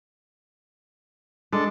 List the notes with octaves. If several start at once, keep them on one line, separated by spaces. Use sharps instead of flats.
G#3 D4 A4